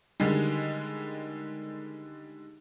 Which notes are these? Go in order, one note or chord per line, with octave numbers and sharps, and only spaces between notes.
D3 D#3 G3 G#3